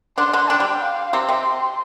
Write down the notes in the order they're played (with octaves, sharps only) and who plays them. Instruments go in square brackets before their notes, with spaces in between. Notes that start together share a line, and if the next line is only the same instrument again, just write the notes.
[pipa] D3 D4 [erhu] C6
[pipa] D3 D4
[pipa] D3 D4 [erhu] G5
[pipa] G3
[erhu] F5
[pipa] C3 C4 [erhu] C6
[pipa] C3 C4